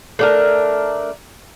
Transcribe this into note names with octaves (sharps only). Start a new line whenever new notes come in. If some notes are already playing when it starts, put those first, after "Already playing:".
A3 D4 A#4